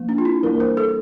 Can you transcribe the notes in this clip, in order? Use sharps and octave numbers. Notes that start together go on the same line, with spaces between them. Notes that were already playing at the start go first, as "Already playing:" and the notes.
Already playing: F3 A#3
D4
F4
E4
E3 G3 A#3 D4 A#4
C5
A4